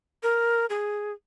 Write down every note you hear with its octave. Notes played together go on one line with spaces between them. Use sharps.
A#4
G#4